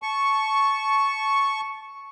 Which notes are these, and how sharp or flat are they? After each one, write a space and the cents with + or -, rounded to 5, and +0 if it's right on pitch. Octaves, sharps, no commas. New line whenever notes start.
A5 -15 C#6 +0